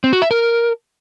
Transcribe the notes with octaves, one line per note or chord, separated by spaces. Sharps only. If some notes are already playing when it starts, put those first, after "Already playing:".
C4
F#4
E5
A#4